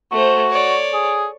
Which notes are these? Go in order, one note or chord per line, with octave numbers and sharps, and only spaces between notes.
A3 F#4 C5
C#5 D5
G#4